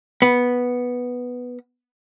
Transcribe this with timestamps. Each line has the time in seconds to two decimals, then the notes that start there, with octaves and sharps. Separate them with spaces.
0.22 B3